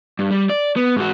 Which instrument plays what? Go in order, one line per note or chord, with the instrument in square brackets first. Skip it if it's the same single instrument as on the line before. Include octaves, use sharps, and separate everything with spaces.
[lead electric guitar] G2
G3
D5
B3
G#2 F#4